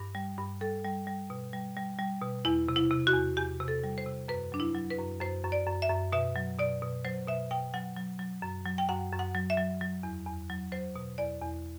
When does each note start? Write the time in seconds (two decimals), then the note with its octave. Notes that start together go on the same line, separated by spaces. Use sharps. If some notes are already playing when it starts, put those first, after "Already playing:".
Already playing: G2
0.15 G3
0.38 G2
0.61 G3 A4
0.85 G3
1.07 G3
1.30 B2
1.53 G3
1.77 G3
1.99 G3
2.22 B2
2.45 E2 E4
2.69 C3
2.76 E4
2.91 C3
3.07 F#4
3.14 E2
3.37 E2 G4
3.61 C3
3.68 A4
3.84 G3
3.98 C5
4.06 C3
4.28 F#2 B4
4.52 F#3 D4
4.60 E4
4.75 F#3
4.90 B4
4.98 F#2
5.21 F#2 C5
5.44 F#2
5.52 D5
5.66 F#2
5.82 E5
5.90 F#2
6.12 B2 E5
6.36 F#3
6.59 B2 D5
6.82 B2
7.05 F#3 C5
7.27 B2 E5
7.51 B2 G5
7.74 F#3 F#5
7.97 F#3
8.19 F#3
8.42 F#2
8.65 F#3
8.78 G5
8.88 F#2 F#5
9.12 F#2
9.19 F#5
9.35 F#3
9.50 E5
9.57 F#3
9.81 F#3
10.03 E2
10.26 E2
10.49 F#3
10.72 F#3 C5
10.96 B2
11.18 E2 D5
11.42 E2